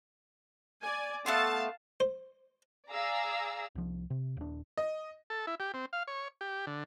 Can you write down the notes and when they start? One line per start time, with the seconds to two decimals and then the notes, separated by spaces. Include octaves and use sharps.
0.82 D5 G#5
1.26 A3 B3 F5 A5 C6
2.00 C5
2.90 G#4 D5 F5 A#5 E6
3.75 C2 F3
4.10 C3
4.37 D#1 D4
4.77 D#5
5.30 A4
5.47 E4
5.60 G4
5.74 C4
5.93 F5
6.07 C#5
6.41 G4
6.67 D3